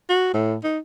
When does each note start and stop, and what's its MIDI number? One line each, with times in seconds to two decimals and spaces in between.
0.09 0.31 66
0.33 0.56 45
0.64 0.78 63